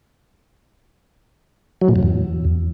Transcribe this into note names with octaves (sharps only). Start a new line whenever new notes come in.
F#3
A#2
F#2
E2